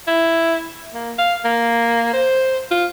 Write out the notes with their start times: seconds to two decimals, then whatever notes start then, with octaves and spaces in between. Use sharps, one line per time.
0.07 E4
0.94 A#3
1.19 F5
1.45 A#3
2.13 C5
2.71 F4